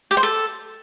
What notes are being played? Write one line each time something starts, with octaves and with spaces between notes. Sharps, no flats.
G4
C5
A4